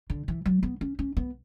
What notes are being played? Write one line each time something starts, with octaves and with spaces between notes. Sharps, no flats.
D3
E3
F#3
B3
C#4
C#4
B3